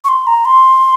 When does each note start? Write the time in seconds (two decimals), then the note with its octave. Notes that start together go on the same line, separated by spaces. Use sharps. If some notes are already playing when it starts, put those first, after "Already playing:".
0.04 C#6
0.09 C6
0.27 A#5
0.45 C6